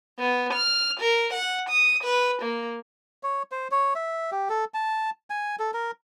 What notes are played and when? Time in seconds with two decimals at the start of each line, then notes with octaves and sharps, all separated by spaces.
0.19 B3
0.53 F6
1.00 A#4
1.33 F#5
1.70 D#6
2.04 B4
2.42 A#3
3.23 C#5
3.52 C5
3.71 C#5
3.95 E5
4.32 G4
4.49 A4
4.74 A5
5.30 G#5
5.59 A4
5.74 A#4